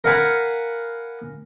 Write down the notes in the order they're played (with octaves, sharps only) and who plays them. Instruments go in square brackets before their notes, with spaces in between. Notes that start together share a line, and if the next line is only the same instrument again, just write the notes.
[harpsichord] A#4 F5 F#5 G#5 B5